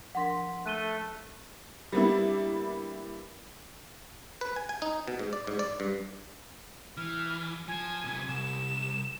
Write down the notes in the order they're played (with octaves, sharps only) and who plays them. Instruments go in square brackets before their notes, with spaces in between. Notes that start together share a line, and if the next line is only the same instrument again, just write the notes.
[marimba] F3 D4 A#4 [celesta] F#5 C6 B6
[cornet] A3 [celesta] F#6 D#7 G7
[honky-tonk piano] G3 A#3 B3 D4 E4
[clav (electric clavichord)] B4
G#5
G#5
D#4
B2
G#2
D5
G#2
D5
G2
[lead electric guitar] E3 [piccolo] F6
[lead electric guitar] F3 [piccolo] G#5
[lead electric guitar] B1 C3
[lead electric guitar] C2 [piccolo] E7